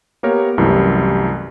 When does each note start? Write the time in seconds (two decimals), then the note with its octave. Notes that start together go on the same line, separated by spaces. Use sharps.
0.23 A#3 B3 G4 A#4 C#5
0.58 C2 F#2 E3 A3 E4 G4